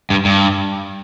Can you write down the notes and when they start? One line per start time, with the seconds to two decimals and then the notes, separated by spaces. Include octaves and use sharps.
0.10 G2
0.25 G2